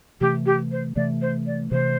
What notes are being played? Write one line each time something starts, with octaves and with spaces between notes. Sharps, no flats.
C3 E3 A3 G4
G4
C5
C3 E3 A3 D5
C5
D5
C3 E3 A3 C5